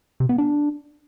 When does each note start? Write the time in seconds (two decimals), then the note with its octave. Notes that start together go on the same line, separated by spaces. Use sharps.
0.20 C3
0.29 B3
0.38 D4